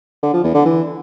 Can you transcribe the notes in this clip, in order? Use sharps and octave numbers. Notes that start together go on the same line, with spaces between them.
D3
F3
E2
D3
E3